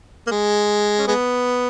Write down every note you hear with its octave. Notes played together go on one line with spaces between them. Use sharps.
A#3
G#3
C#4
G#3 B3